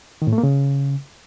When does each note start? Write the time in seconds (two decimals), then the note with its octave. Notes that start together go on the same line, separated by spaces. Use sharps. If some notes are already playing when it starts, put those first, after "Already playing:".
0.22 D#3
0.27 A2
0.33 A3
0.38 A#3
0.43 C#3